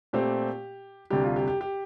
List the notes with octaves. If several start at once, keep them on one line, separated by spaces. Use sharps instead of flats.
A#2 A3 C4 G4
D2 C3 G3 G4
F4
G4
G4
G4